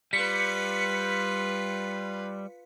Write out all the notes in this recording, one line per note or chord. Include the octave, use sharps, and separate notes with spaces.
G3 F4 B4 B6 C#7